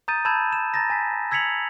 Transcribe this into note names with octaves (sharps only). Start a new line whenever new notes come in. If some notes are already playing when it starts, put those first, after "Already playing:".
A#5 D#6 G6 A6 D#7
A5 B5 E6 G6 G#6 E7
E7
A#5 A6 A#6
G#5 A6 B6
E6 G#6 B6 C#7 F7 F#7